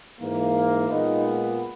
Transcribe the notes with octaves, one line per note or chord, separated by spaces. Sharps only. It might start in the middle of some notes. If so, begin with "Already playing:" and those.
G#2 E3 A#3
A#2 G#3 B3 D#4